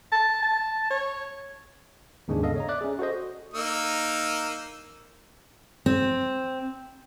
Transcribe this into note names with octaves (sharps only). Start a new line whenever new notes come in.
A5
A5
C#5
D#2 G#2 C#3 G#3 C#4 D4
B3 A4 D#5 F5
C#5 D#5 A#5
D5 E5 D6 F#6
C#4 G#4
F#4 A4 C5 D#5
A#3 D#4 E6
C4